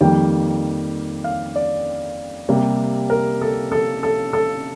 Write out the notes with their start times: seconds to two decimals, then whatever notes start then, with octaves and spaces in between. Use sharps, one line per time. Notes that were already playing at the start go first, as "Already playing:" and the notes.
0.01 F2 D#3 G3 A#3 G5
1.24 F5
1.56 D5
2.49 C3 G3 A#3
3.10 A#4
3.42 A4
3.72 A4
4.03 A4
4.33 A4